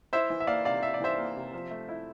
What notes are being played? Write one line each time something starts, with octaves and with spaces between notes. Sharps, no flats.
E4 C5 E5
E3
E5
A#3 D5 F5
C3 D5 F5
E4 E5
D5
E3 C5 E5
A#3
C3
F3
A3
E4